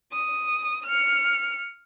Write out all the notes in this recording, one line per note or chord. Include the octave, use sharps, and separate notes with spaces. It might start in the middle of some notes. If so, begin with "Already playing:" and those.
D#6
F6 C#7